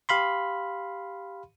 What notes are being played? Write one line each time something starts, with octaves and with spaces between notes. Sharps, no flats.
G4 F5 B5 C6